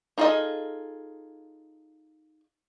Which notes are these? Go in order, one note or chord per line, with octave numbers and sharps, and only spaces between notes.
D#4 F4 G#4 A4 D#5